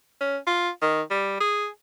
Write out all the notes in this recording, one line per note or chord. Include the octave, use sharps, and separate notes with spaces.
C#4
F4
D#3
G3
G#4